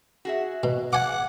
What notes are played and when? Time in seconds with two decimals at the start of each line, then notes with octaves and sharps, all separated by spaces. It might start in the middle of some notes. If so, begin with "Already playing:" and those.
0.25 F#4 G#4 E5
0.63 B2
0.93 F#5 G#5 D6